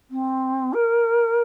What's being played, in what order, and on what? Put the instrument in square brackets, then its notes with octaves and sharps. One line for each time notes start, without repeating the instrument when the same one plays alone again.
[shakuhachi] C4
A#4